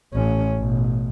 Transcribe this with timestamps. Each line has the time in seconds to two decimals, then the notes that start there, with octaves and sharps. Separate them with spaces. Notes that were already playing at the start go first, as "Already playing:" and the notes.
0.14 A1 C#4
0.57 A1 B2